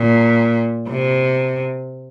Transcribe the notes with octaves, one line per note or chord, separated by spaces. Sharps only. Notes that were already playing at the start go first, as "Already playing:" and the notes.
Already playing: A#2
C3